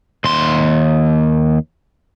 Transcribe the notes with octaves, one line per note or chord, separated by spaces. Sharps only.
D#2 C6